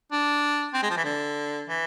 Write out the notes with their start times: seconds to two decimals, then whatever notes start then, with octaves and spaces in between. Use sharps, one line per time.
0.12 D4
0.74 C4
0.82 G#3
0.90 F3
0.97 E3
1.04 D3
1.68 E3